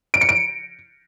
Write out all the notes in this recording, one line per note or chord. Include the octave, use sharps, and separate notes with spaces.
D7
C#7
D7